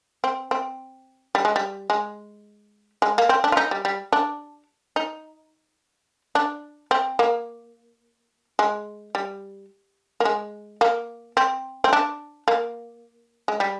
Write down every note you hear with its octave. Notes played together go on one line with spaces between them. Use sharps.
C4
C4
G3
G#3
G3
G#3
G#3
A#3
C4
D4
F4
D#4
G3
G3
D4
D#4
D4
C4
A#3
G#3
G3
A#3
G#3
A#3
C4
C4
D4
A#3
G#3
G3